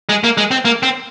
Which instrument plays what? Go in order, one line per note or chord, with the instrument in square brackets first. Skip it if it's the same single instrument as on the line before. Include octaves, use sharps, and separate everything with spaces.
[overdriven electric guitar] G#3
A#3
G#3
C4
A#3
C4